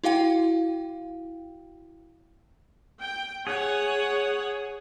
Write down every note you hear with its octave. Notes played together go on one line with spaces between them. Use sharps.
E4 F#4 F5 G5
G5
G#4 C#5 F#5